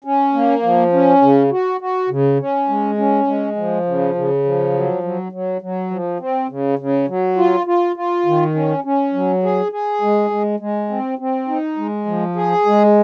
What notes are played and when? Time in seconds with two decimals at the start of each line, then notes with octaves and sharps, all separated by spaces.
0.04 C#4
0.34 A#3
0.63 F3
0.93 C#4
1.21 C#3
1.51 F#4
1.81 F#4
2.09 C#3
2.39 C#4
2.69 G#3
2.98 C#4
3.27 G#3
3.56 F3
3.85 C#3
4.15 C#3
4.45 F3
4.74 F#3
5.03 F#3
5.32 F#3
5.61 F#3
5.91 F3
6.20 C4
6.50 C#3
6.79 C#3
7.08 F#3
7.37 F4
7.67 F4
7.96 F4
8.26 D#3
8.55 C#4
8.84 C#4
9.14 F#3
9.43 G#4
9.72 G#4
10.01 G#3
10.30 G#3
10.60 G#3
10.89 C4
11.19 C4
11.48 D#4
11.77 G#3
12.06 F3
12.36 G#4
12.66 G#3